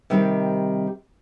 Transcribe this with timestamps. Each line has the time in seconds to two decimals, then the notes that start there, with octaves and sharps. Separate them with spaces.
0.10 C3 D#3 G3 C4 D#4